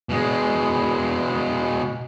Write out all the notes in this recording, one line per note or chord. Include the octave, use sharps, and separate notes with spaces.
B2 G#3